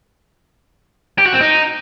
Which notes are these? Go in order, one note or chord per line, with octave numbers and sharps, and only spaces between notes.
G4
F#4
C4
D#4